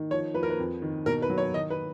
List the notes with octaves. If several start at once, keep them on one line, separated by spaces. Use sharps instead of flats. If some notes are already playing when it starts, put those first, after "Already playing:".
Already playing: D#3
F3 C#5
F3 B4
A#4
B4
F2
D#3
B2 A#4
B4
F#3
C#5
D#3 D#5
B4